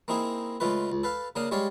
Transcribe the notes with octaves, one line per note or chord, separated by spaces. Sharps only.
A#3 C4 D#4 E4 G#4
C#3 G#3 A3 F4 B4
C#2
A4 B4 F5
C#3 A#3 D4 F5 D#6
G3 G#3 C#5 D5 F5